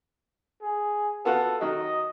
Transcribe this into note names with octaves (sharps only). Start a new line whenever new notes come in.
G#4
B3 F4 F#4 A4
D#3 F#3 D#5